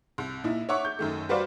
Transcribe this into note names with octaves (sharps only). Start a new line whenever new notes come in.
C2
A#2 D#4 E4
C#5 E5 F#5 C#6 D6
G6
F#2 D#3 A3
G3 F#4 B4 C5 D5 F5